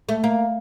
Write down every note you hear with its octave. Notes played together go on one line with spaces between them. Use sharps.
A3
A#3